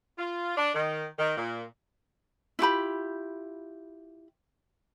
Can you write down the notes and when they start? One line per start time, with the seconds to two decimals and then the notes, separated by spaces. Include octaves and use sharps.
0.19 F4
0.57 D4
0.75 D#3
1.19 D#3
1.38 A#2
2.59 E4 F4 G4 B5